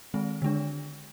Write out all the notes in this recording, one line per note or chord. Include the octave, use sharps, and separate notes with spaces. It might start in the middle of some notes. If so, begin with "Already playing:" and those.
D#3 G#3 C4
D3 G#3 D4